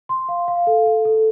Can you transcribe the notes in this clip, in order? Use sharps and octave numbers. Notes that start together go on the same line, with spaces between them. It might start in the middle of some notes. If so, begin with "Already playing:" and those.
C6
F5
F5
A4
A4
A4